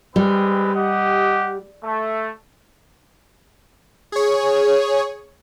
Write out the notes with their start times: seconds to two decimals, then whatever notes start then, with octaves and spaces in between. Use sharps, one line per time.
0.16 G3 G#3 C4 B4
0.75 G4 D#5 F#5
1.83 A3
4.12 G#4 C#5